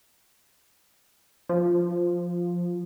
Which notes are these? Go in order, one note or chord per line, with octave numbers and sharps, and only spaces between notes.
F3